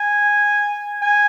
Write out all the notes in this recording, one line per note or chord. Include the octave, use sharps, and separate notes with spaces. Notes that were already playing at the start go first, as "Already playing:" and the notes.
Already playing: G#5
G#5